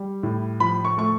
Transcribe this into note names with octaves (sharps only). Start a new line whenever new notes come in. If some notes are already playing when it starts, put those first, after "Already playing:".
Already playing: G3
A2
F3 B5
C#6
A3 C#6